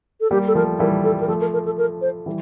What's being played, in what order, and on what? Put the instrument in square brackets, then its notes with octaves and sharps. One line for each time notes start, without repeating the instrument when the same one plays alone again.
[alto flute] A4
[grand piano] G3 A#3 [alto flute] G4
[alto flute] A4
[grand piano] F3 A3 [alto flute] A#4
[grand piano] E3 G3 [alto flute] A#4
[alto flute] A4
A#4
[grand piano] F3 A3 [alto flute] A4
[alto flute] A#4
A#4
A4
A#4
C5
[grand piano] E3 G3